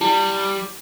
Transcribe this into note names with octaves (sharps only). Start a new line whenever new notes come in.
G3 E4